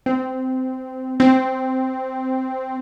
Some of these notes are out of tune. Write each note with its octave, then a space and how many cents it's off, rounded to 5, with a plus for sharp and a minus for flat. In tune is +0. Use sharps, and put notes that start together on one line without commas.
C4 -15
C4 -5